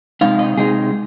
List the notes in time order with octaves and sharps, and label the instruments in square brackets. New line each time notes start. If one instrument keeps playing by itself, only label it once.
[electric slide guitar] C3 G#3 D#4 F5
D#5
C3 G#3 D#4 G#4